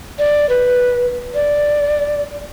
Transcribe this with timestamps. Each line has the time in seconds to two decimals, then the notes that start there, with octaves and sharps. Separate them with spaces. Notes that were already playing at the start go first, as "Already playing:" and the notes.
0.19 D5
0.49 B4
1.35 D5